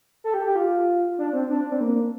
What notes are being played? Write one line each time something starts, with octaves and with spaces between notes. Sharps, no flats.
A4
G4
G4
F4
D4
C4
D4
C4
A#3